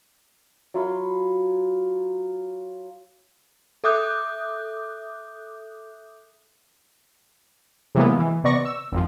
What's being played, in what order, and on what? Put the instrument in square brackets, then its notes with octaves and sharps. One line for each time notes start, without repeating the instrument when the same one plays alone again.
[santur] F#3 F4 F5 B5
[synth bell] A4 E5 D6 D#6 F#6 G6
[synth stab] C3 E3 F#3 G#3 A#3 B3
E3
C3 B3 D5 C#6 A#6
E6
G#1 F2 F3